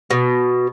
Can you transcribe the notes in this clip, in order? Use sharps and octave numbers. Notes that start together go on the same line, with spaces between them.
B2